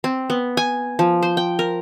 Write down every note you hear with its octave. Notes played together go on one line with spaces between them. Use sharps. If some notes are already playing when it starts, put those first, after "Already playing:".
C4
B3
G#5
F3
C5
G5
A#4